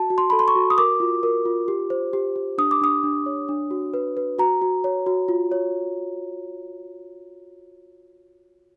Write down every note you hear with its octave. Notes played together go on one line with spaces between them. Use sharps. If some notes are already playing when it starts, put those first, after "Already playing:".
Already playing: F#4 A5
F#4
C6
A4 B5
C6
C#6
F#4
D#6
A#4 D6
F4
A#4
F4
G4
C5
G4
G4
D4 D#6
D6
D4 D#6
D4
C#5
D4
F#4
B4
B4
F#4 A#5
F#4
C#5
F#4
F4
C#5